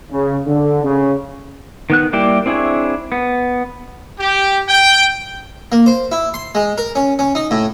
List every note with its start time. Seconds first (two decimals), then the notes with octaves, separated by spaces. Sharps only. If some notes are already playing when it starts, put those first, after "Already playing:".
0.12 C#3
0.46 D3
0.84 C#3
1.90 D#3 B3 F#6
2.13 G3 A#3 E4 G4 D5
2.46 C4 D4 E4 G#4 C#5
3.12 B3
4.20 G4
4.69 G5
5.72 A#3
5.86 C5
6.12 E4
6.34 C6
6.55 G#3
6.78 A#4
6.95 C#4
7.19 C#4
7.35 D#4
7.51 A2